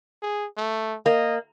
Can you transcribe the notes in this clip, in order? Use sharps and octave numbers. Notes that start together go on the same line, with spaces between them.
G#4
A3
A#3 D#5